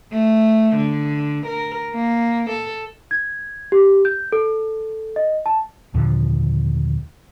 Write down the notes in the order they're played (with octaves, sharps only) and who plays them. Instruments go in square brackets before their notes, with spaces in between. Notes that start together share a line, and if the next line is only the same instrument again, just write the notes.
[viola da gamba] A3
D3
A#4
A#3
A4
[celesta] G#6
G4
G6
A4
D#5
A5
[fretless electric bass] D#2 A#2 D3 F3